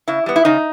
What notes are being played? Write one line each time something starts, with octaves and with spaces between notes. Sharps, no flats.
C#3 E4
G3 B3
E4
C#3 D#4